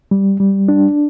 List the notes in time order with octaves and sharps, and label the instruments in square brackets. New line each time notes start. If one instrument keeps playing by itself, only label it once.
[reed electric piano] G3
G3
D4